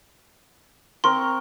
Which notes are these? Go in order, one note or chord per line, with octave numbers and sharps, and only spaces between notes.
C4 A#4 C6 C#6